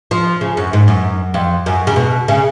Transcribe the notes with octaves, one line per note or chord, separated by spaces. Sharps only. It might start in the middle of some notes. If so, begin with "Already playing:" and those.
F3
C#3
F#2
G#2
F#2
F2
F#2
C#3
B2
C#3